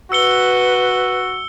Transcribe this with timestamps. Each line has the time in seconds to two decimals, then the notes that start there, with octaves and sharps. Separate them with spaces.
0.12 F#4 B4 E6 C#7 G7